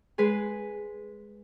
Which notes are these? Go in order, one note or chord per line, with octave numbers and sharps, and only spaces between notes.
G#3 G#4 B4